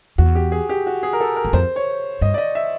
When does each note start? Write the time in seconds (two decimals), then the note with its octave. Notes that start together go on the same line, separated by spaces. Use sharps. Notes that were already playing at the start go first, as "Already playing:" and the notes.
0.18 E2 F#4
0.35 G4
0.52 G#4
0.69 G4
0.87 F#4
1.03 G#4
1.13 A#4
1.20 A4
1.36 A#4
1.45 F#2
1.53 F2 C5
1.76 C#5
2.21 G2 D#5
2.34 D5
2.38 D#5
2.55 E5